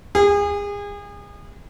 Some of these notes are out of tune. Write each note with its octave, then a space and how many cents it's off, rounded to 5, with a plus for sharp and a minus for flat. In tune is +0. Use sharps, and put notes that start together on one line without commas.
G#4 -35